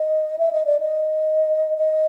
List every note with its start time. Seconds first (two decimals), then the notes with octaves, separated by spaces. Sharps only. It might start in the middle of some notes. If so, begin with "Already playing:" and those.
Already playing: D#5
0.39 E5
0.53 D#5
0.66 D5
0.80 D#5
1.78 D#5